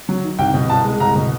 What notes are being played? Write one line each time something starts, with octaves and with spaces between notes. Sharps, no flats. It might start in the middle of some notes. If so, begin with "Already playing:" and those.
F#3
D#3
C2 G5
B2
C2 A5
G#3
C2 A#5
B2